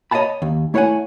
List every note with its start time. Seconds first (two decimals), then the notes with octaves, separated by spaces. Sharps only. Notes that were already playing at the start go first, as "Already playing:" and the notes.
0.11 C#5 D#5 E5 F#5 A5 B5
0.42 D#2
0.74 A3 E4 C#5 F5 F#5 G#5